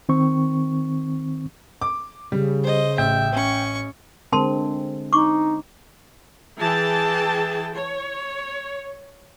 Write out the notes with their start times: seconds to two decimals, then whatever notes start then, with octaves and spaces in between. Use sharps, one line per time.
0.09 D#3 C4 C#6
1.81 D6
2.32 C#3 G3
2.63 C5 D#5
2.98 A1 E5 G5
3.32 C#4 C#6
4.32 D3 G#3 C4 A#4 A5 C6
5.13 D#4 C#6 D6
6.59 E3 G#4 G5 A5
7.74 C#5